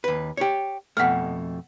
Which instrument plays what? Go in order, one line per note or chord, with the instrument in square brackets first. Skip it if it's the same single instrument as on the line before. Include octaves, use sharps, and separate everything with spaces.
[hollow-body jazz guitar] D#2 B4
G4 C#5
[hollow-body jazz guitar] F2 B2 A3 [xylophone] F#5 F6